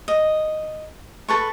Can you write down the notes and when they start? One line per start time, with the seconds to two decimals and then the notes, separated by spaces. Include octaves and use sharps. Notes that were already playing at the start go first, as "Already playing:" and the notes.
0.08 D#5
1.29 A4 B4 C#6